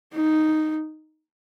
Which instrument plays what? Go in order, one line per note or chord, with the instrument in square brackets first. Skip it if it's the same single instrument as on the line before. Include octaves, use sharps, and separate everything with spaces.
[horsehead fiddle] D#4